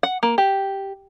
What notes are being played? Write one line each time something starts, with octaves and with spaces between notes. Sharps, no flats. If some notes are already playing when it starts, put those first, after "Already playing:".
F#5
A#3
G4